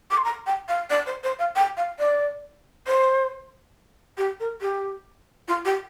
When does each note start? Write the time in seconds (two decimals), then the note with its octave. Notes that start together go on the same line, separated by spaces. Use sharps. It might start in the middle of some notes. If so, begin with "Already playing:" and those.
0.11 D6
0.17 C6
0.24 A#5
0.46 G5
0.68 F5
0.89 D5
1.06 C5
1.23 C5
1.39 F5
1.56 G5
1.77 F5
1.99 D5
2.87 C5
4.17 G4
4.40 A#4
4.61 G4
5.48 F4
5.65 G4